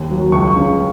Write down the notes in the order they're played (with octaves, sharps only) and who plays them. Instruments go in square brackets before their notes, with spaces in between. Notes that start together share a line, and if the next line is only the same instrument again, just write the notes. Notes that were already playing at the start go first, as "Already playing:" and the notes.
Already playing: [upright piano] D#2
F#3
C#2 C#6
C#3